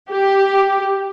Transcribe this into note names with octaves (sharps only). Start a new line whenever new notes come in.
G4